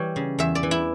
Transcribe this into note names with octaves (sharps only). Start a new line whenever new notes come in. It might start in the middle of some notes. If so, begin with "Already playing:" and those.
Already playing: E3 G3 C#5
C#3
E2 E5
D5
E3
E4